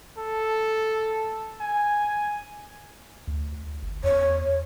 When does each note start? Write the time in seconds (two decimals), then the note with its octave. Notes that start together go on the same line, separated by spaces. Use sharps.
0.18 A4
1.61 G#5
3.27 D2
3.82 G1
4.04 E2 C#5